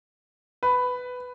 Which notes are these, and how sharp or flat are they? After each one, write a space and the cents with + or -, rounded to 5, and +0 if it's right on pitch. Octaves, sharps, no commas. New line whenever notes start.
B4 +10